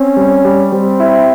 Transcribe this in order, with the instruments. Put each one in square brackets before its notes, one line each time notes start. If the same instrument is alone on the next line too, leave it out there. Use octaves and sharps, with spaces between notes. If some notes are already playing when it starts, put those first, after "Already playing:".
Already playing: [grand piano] C4 [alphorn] C#4
[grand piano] G3
G3
[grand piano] G3 [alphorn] C4
[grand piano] E4